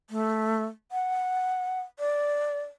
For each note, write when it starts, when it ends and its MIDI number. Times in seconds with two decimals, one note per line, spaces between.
0.10 0.63 57
0.92 1.81 78
1.99 2.60 74